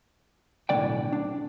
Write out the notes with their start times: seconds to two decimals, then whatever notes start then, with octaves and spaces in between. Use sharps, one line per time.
0.69 B1 A2 D3 F#3 D5 G5
1.13 D4